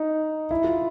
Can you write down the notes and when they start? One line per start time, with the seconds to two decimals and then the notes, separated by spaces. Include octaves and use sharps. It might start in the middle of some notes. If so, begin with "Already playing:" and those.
Already playing: D#4
0.51 E4
0.64 F4